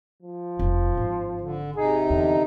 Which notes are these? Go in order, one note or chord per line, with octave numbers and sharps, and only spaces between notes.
F3
F1 D4
G#1
D3
C3 D#4 G#4
E2 D3